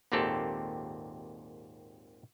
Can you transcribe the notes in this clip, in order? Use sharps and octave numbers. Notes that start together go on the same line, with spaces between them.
G#1 D#2 A#2 C4 G4 A4